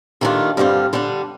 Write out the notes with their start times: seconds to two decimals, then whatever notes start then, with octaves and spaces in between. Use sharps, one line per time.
0.21 D#2 D#3 A3 D4 F4
0.57 G2 D3 G3 C4 F4
0.93 D3 G3 D4